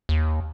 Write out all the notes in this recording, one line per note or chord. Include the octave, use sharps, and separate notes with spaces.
D#2